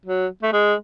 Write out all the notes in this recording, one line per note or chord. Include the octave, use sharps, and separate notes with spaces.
F#3
A3
G#3